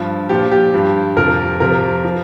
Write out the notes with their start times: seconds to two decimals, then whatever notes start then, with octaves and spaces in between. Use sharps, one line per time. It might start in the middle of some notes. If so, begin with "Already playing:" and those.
Already playing: G2 F3
0.29 A#2 F3 G4
0.51 G4
0.74 G2 F3
1.16 F2 C3 F3 A#4
1.60 F2 C3 F3 A#4
2.04 F3